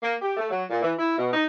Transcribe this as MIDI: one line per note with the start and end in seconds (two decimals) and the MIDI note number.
0.02 0.16 58
0.22 0.34 67
0.37 0.49 57
0.50 0.63 54
0.69 0.81 46
0.83 0.92 52
0.98 1.16 64
1.18 1.32 47
1.33 1.46 63